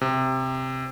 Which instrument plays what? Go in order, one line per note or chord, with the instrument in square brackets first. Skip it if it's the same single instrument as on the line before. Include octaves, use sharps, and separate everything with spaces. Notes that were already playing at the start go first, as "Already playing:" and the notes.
[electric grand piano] C3